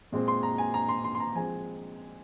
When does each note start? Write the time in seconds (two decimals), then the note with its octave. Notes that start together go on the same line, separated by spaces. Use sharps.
0.12 A#2 G#3 C4
0.28 C6
0.43 A#5
0.58 G#5
0.74 A#5
0.89 C6
1.04 C6
1.15 C6
1.20 A#5
1.35 F3 G#3 C4 G#5